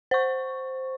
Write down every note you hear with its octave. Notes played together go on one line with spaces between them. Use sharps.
C5 C#6